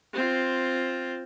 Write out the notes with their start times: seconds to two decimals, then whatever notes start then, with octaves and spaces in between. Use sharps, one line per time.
0.13 C4 F4